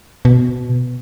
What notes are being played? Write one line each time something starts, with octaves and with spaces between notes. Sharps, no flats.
B2